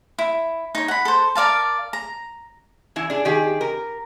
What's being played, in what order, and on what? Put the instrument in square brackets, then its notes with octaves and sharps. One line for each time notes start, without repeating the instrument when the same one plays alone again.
[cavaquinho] E4
D#4 C#5
F#5 B5
A4 C5
A#4 D5 F5 A5
A#5
[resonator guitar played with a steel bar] E3 E4
D4 G#4
D#3 G4 G#4
A#4